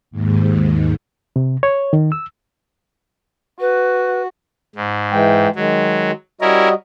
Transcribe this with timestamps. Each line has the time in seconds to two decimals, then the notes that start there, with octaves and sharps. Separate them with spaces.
0.11 D#2 G#2
1.36 C3
1.63 C#5
1.93 D#3
2.12 E6
3.60 F#4 B4
4.75 G#2
5.12 E3 G#3 G5
5.56 D#3 F#3 G#3
6.41 G3 C#4 E4 F#4 A#4 D#5